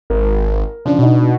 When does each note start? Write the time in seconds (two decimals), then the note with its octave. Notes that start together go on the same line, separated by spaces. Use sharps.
0.10 G#1 A#4
0.85 C#3 F3 D4
0.99 B2 D4 D#4